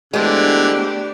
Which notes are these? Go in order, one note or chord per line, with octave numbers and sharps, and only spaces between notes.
D3 E3 G#3 A3 B3 D4 G4 C5